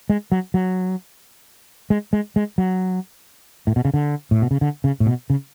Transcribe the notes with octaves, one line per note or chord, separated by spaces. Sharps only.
G#3
F#3
F#3
G#3
G#3
G#3
F#3
A2
B2
C#3
D3
A2
B2
C#3
D3
C#3
A2
B2
C#3